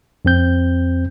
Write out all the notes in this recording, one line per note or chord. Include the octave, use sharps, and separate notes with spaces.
F2 C4 G6